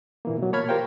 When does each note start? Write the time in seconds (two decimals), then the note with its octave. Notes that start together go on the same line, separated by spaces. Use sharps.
0.25 A#2 E3 A#3
0.38 B2 F#3
0.53 A#3 C#5 A5 B5 F6 G#6
0.69 F4 G4 A#4 C5 F5 G5